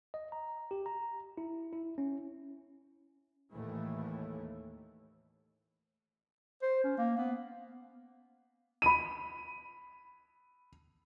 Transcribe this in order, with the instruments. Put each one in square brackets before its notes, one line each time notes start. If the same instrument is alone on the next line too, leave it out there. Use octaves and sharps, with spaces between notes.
[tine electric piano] D#5
A#5
G4
A#5
E4
E4
C#4
[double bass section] D#2 A2 E3 A3
[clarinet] C5
C#4
A#3
B3
[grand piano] B5 D#7